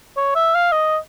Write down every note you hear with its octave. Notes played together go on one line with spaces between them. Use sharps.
C#5
E5
F5
D#5